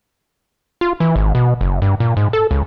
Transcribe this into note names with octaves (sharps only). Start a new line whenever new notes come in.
F4
E3
G#1
B2
F#1
G2
A#2
G#2
A4
C#2